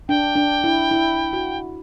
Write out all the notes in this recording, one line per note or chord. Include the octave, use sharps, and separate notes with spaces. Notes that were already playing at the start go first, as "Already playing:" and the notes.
D4 G5
D4
E4
E4
F#4